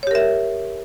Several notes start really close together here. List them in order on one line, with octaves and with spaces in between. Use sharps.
C#5 G4 A#4 E5